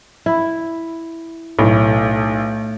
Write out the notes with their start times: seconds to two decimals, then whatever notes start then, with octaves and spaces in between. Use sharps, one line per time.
0.26 E4
1.59 B1 A2